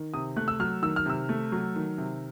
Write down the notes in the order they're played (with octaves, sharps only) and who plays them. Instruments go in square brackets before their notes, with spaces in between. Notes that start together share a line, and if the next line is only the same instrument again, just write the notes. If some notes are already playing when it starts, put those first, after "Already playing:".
Already playing: [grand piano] D#3
C3 D#6
A3 F#6
E6
F#3 F6
D#3 E6
F6
C3 E6
A3
F#3
D#3
C3